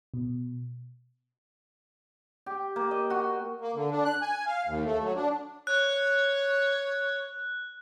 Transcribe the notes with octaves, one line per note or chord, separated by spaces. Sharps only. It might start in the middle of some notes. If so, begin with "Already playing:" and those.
B2
G4
A#3
D#5
F#4
A#3
D3
D4
F#6
G#5
F5
D#2
A3
F#3
D4
C#5 F#6